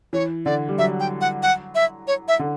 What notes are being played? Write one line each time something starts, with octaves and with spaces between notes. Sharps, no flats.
E3 C#5
D3 D5
G3
F#3 E5
G5
F#5
F#5
E5
C#5
E5
D3